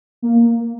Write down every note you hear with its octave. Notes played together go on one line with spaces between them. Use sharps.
A#3